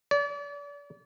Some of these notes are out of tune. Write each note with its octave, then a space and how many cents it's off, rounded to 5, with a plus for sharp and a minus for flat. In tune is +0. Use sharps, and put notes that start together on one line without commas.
D5 -40